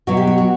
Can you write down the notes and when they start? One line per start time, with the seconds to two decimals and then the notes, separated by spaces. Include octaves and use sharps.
0.07 B2 F#3 F#4
0.17 G4
0.27 F#4
0.38 F#4